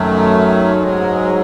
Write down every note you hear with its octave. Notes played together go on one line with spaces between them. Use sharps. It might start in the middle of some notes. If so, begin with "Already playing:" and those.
Already playing: F#2 D#3 F#3 A3
G#2 F#3 G#3